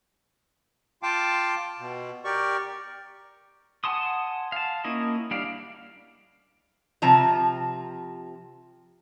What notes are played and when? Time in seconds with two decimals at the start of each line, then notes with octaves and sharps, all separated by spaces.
1.03 F4 F5 G5 A5 D6
1.79 B2
2.25 G4 A#4 D5 C#6
3.84 F#5 G#5 A5 C6 D#6
4.52 F5 A5
4.84 A#3 C#4 E4 D#5
5.31 G3 D4 D5 F5
7.02 C3 F3 A5 A#5